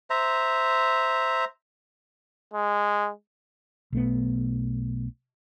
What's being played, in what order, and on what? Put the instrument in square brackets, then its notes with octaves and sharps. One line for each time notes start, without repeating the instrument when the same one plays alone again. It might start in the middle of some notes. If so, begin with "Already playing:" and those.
[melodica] C5 E5 A#5
[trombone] G#3
[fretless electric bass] B1 A3 B3